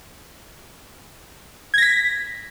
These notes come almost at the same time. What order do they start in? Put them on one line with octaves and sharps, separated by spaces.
G#6 A#6 B6